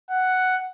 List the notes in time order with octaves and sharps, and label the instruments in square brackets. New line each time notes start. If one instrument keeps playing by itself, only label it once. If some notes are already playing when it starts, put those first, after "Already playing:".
[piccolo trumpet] F#5